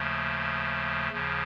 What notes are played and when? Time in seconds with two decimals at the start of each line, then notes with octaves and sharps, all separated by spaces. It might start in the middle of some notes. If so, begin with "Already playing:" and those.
Already playing: D#2 C#3 F3 A3
1.12 D#2 C#3 F3